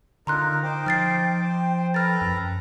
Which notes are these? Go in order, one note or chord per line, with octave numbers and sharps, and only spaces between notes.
D3 D#4 F4 A#4 A#5 C6 F#6
D#4 C5 G5 D6
F3 F6 A6 C7
C5
A4 B4 A#5 F6 A6
F#2